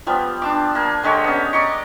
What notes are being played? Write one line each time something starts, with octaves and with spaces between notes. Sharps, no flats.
F3 G3 B3
D4 A5 D6
A#3 G#5
D3 G#3 G4 C#5
B3 C#4
D5 D#5 A#5 C#6